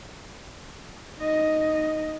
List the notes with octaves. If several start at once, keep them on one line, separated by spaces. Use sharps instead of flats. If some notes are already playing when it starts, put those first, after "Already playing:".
D#4 D#5